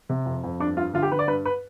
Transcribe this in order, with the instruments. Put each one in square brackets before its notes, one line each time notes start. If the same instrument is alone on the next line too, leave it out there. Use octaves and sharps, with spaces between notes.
[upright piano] C3
F2
F2
G2 D4
G2 F4
D3 F4
G4
D3 B4
D5
G2 B4
B4